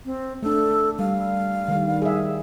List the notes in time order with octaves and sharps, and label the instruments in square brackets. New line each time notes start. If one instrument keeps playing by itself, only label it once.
[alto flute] C4
[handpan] A3 D4 [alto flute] A4
[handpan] G3 [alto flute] F5
[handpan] D#3 G3
G#4 E5